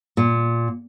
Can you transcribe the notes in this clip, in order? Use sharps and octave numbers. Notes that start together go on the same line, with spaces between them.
A#2